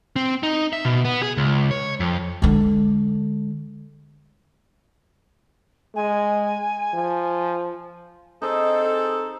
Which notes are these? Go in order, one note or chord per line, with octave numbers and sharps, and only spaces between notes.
C4
D#4
E5
B2
B3
G#4
C#2
C#5
F2
D3 G#3
G#3 G#5
F3
C4 D#4 G#4 A4